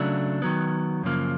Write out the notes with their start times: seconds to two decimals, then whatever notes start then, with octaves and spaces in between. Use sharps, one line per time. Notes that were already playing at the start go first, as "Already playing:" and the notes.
Already playing: C#3 F#3 A3 D4
0.42 D#3 F#3 B3
1.03 F#2 C#3 F3 A#3